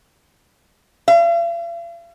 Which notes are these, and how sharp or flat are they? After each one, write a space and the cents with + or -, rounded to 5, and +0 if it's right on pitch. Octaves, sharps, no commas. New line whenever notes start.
F5 -45